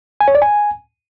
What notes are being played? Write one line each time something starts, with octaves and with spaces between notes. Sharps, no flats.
G#5
C#5
D5
G#5